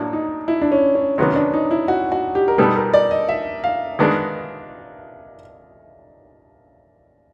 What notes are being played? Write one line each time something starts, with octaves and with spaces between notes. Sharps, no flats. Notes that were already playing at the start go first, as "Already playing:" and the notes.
Already playing: A2 F#3 A#3 D4
D#4
E4
D4
C#4
C#4
C3 D#3 F#3 B3 C#4
D4
D#4
E4
F#4
F#4
G4
A#4
B2 G3 B3 D#4 A4
A#4
D5
D#5
E5
F5
D#3 G#3 B3 D4